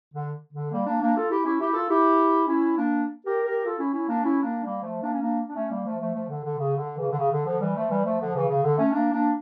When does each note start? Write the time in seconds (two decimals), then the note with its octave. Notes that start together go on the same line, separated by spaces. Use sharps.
0.13 D3
0.52 D3
0.72 G3 A#3
0.86 A#3 D4
1.02 A#3 D4
1.15 F4 A4
1.31 E4 G4
1.45 C#4 E4
1.60 E4 G4
1.74 F4 A4
1.89 E4 G4
2.47 C#4 E4
2.77 A#3 D4
3.26 G4 A#4
3.46 G4 A#4
3.65 F4 A4
3.79 C#4 E4
3.94 C#4 E4
4.09 A#3 D4
4.24 C#4 E4
4.43 A#3 D4
4.63 G3 A#3
4.82 F3 A3
5.02 A#3 D4
5.12 C#4
5.21 A#3 D4
5.49 D4
5.56 A3 C#4
5.70 G3 A#3
5.85 F3 A3
5.99 F3 A3
6.15 F3 A3
6.28 D3
6.44 D3
6.58 C#3
6.77 D3
6.97 C#3 E3
7.11 D3
7.18 C#3
7.31 D3
7.46 D3 F3
7.61 E3 G3
7.76 F3 A3
7.90 E3 G3
8.05 F3 A3
8.19 D3 F3
8.34 C#3 E3
8.49 C#3
8.64 D3
8.78 A3 C#4
8.93 A#3 D4
9.12 A#3 D4